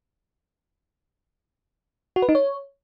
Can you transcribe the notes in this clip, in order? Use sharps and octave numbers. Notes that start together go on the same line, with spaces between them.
F#4
B4
D#4
C#5